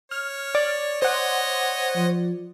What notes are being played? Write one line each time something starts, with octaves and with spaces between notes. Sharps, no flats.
C#5 F6
D5
C5 C#5 D#5 F#5
F3